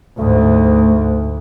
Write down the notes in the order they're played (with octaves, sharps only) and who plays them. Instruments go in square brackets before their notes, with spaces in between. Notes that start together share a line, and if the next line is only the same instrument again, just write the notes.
[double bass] D2 G#2 [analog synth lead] A3